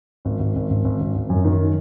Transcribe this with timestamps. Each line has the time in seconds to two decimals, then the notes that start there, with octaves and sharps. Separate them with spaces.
0.25 G#1
0.40 G#1
0.56 G#1
0.70 G#1
0.84 G#1
1.00 G#1
1.15 G#1
1.30 F#2
1.45 D#3